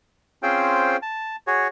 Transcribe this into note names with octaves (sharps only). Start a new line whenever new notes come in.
C4 C#4 F4 G#4 C5 G5
A5
F#4 G#4 C#5